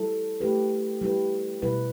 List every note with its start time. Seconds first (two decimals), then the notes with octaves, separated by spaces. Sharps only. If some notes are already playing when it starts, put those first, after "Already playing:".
Already playing: G3 E4 A4
0.41 A3 E4 G4 B4
1.02 G3 E4 G4 B4
1.62 B2 G3 E4 B4